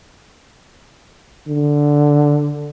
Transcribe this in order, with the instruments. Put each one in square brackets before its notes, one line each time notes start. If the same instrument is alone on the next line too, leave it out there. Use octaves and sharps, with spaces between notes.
[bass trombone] D3